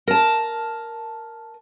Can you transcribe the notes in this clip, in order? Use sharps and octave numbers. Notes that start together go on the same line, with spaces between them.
A#4 A5